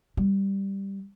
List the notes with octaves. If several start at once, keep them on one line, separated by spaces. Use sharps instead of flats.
G3